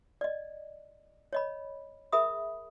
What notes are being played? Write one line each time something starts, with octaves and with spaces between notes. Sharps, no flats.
D5 D#5
C#5 D#5 B5
G#4 A#4 E5 B5 D#6